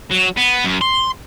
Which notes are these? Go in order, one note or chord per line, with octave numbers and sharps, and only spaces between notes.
F#3
B3
F#2
C6